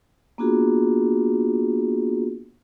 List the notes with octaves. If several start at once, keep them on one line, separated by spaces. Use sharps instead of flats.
A#3 B3 D4 F4 F#4 G#4